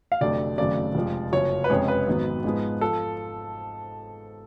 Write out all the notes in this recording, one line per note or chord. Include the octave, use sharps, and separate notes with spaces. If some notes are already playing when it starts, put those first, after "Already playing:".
F5
F1 F2 D3 F#3 A3 D5
G#1 F#2 C#3 F#3 A3 D5
F1 F2 F3 G#3
F#1 F#2 F3 C#5
B4
F1 F2 C#3 G#3 C#5
B4
G#1 G#2 F#3 B3
G#2 F3 G#3 B3
F3 A4